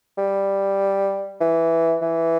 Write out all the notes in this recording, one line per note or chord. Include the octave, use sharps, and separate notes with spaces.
G3
E3
E3